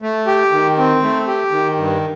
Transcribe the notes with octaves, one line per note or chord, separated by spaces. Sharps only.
A3
G4
D#3
C4
A3
G4
D#3
G2